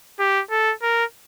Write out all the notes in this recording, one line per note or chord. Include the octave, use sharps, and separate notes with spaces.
G4
A4
A#4